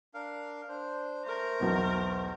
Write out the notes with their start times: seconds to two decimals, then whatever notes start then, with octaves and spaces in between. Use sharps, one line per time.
0.14 D4 A#4 F5
0.68 D4 C5
1.25 A3 A#4 C5
1.60 B1 E2 B2